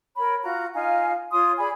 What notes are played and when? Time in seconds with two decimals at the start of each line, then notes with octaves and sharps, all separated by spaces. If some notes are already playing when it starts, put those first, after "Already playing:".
0.17 A#4 C#5 B5
0.43 F4 F#4 A#5
0.74 D#4 F4 F5 G#5
1.31 F4 C#5 C6 D#6
1.58 G#4 D5 G#5 B5